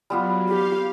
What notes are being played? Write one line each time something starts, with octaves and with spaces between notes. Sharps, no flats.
F#3 G3 B3 F4
G4 F5